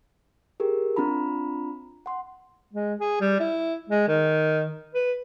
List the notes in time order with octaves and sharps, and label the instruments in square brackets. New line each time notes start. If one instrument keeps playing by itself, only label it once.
[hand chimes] G4 G#4 A#4
C4 D4 F4 A#5 B5
F#5 C6
[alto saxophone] G#3
G#4
G3
E4
G#3
D#3
B4